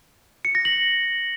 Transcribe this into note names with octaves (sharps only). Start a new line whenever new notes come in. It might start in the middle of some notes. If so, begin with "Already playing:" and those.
C#7
A#6
F#7